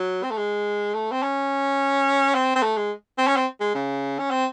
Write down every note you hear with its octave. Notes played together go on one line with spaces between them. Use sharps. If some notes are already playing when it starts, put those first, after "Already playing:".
Already playing: F#3
C4
A3
G#3
A3
C4
C#4
C4
C4
A3
G#3
C4
C#4
C4
G#3
C#3
C#4
C4